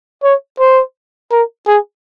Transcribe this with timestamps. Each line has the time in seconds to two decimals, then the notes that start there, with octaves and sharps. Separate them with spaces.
0.23 C#5
0.59 C5
1.32 A#4
1.67 G#4